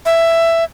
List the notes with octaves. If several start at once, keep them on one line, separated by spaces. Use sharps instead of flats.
E5